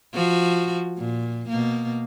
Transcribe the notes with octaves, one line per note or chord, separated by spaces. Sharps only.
F3 F#4
A#2
B2 A#3